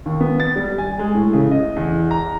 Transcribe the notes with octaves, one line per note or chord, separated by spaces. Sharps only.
D#2
B3
A6
G3
G#5
G#3
A2
C#3
D#5
E2
A#5